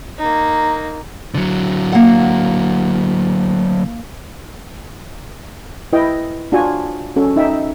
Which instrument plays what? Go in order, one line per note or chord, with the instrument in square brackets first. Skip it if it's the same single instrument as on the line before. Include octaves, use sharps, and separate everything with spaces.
[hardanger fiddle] A#3 D#4
[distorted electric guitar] D3 F#3
[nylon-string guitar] A#3 F#5
[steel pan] E4 B4 D#5 G5
D4 F4 F#4 D5 G#5
C#4 F#4 A4
D#4 E5 G5